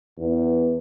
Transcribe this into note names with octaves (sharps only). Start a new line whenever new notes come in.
E2